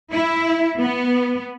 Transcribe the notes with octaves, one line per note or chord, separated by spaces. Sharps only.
E4
B3